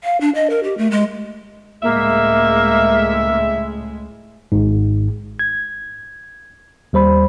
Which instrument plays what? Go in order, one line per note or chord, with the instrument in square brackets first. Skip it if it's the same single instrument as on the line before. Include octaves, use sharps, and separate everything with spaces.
[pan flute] F5
D4
D#5
A#4
G4
A3
G#3
[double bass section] C#2 A2 G#3 [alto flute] A#3 [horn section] E5
[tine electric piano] G#1 G#2
G#6
D#2 G3 C5 B5